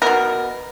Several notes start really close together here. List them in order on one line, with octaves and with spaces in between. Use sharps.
G#3 B3 A#4 B2